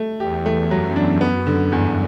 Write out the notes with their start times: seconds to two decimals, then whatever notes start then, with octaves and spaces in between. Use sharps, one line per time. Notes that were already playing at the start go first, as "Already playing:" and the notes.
Already playing: A3
0.19 E2 G4
0.46 A3
0.71 F#2 F#3
0.96 D4
1.21 F#2 B3
1.47 D3
1.72 E2 G2